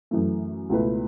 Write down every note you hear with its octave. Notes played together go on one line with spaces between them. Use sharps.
F#2 E3 A3
C#2 B2 A3 E4 B4